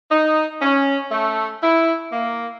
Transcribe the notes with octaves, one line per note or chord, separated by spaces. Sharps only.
D#4
C#4
A3
E4
A#3